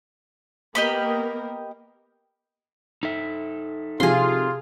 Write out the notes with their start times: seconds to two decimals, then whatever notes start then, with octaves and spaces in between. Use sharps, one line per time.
0.75 A#3 B3 G4 A#4 D#5 B5
3.03 D#4 A4 E5
4.00 C3 F3 F4 G#4 C6